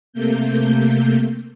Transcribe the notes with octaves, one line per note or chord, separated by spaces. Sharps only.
C3 A3 A#3 G6